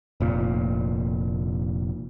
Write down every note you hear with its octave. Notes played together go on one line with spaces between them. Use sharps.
F1 A#2